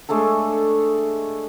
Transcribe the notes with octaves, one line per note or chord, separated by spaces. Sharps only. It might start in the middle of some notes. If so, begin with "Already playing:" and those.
G#3 A3 D4 A4